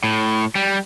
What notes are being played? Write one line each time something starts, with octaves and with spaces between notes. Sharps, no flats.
A2
G3